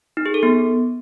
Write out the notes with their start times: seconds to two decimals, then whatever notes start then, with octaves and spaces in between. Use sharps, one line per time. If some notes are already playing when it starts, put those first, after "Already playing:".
0.17 D#4
0.26 G#4
0.34 A4
0.43 B3